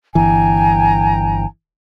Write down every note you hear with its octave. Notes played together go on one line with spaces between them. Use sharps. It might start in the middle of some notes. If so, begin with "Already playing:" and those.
G1 E3 G5 G#5 A#5